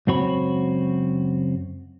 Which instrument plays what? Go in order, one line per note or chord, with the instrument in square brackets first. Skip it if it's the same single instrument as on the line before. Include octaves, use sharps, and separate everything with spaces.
[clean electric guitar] C#2 F#2 C4 F#4 C#5 B5